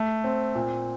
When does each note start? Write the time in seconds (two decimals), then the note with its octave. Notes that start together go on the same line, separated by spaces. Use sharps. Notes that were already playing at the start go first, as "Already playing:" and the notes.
Already playing: A3
0.24 C4
0.55 A#2